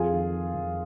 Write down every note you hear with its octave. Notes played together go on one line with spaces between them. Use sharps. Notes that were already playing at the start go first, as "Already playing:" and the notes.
Already playing: F2 F4 G#4
D#3
D#3
F2